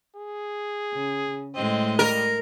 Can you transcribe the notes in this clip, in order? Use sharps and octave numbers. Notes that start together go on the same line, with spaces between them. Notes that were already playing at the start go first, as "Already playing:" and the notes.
G#4
C#3
A2 G#3 C4 D#5
G3 A#4